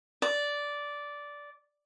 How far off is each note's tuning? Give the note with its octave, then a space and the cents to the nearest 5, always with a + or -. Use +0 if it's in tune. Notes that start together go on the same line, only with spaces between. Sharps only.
D5 -10